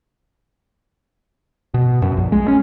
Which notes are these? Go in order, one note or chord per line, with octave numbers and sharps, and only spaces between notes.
B2
F#2
A#1
G#3
C#4